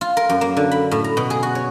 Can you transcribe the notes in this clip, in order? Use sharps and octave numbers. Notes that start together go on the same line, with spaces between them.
F4
A#4
F#2
A#3
D3
B5
A2
A#5
B2
G#4
F#4
C#5